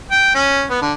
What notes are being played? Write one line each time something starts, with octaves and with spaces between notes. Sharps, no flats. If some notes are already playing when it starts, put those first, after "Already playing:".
G5
C#4
B3
D3